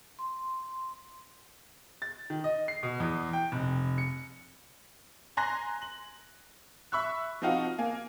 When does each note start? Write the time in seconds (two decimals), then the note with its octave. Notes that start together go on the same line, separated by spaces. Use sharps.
0.19 C6
2.02 A6
2.30 D#3
2.44 D#5
2.68 C7
2.83 B2
3.00 E2
3.33 G5
3.52 F1
3.98 C#7
5.37 G#5 A#5 C6 F#6 A#6
5.82 F#7
6.92 E5 B5 C#6 E6 F#6
7.42 F3 C4 D#4 F4 F#4
7.79 A#3 G#5